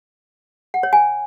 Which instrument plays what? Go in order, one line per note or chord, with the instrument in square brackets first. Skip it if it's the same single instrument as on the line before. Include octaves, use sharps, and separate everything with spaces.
[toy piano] F#5
C#5
G#5